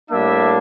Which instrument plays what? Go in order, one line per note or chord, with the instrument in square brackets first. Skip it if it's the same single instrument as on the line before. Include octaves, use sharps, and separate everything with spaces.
[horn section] A2 G3 A#3 D4 E5